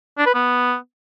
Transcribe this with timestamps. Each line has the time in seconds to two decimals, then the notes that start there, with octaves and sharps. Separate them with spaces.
0.18 D4
0.26 B4
0.34 B3